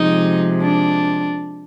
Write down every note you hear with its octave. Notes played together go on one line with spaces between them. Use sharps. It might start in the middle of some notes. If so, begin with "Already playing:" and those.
Already playing: C3 F3 G#3 D#4
D4